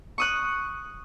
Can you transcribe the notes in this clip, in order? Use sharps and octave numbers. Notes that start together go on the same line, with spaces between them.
C#6 D#6 F#6